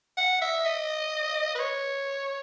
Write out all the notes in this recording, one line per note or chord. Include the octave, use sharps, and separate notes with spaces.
F#5
E5
D#5
B4
C#5